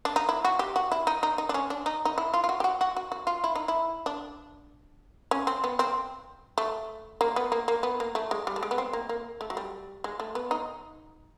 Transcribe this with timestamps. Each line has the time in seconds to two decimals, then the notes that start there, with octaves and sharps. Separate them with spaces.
0.05 D4
0.16 D#4
0.29 E4
0.45 F#4
0.59 G4
0.76 F#4
0.92 E4
1.07 D#4
1.23 D#4
1.38 D#4
1.49 D4
1.54 C#4
1.70 D4
1.86 D#4
2.05 D#4
2.18 E4
2.34 F4
2.44 F4
2.49 F#4
2.60 G4
2.64 F#4
2.81 F#4
2.97 F#4
3.12 F#4
3.27 F4
3.44 E4
3.55 D#4
3.68 E4
4.06 D4
5.31 C#4
5.47 C4
5.64 B3
5.79 C4
6.58 A3
7.21 A#3
7.36 B3
7.52 A#3
7.68 A#3
7.83 B3
8.00 A#3
8.15 A3
8.31 G#3
8.47 G3
8.56 A3
8.63 G#3
8.71 B3
8.78 C4
8.93 A#3
9.09 A#3
9.41 A3
9.50 F#3
9.57 G3
10.04 G#3
10.20 A3
10.35 B3
10.51 D#4